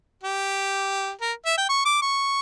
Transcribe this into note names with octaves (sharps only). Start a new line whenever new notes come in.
G4
A#4
E5
G5
C#6
D6
C#6